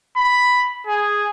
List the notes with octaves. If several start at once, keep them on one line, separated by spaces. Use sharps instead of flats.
B5
G#4